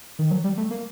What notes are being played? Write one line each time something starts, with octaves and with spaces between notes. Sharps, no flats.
D#3
F#3
G3
A3
A#3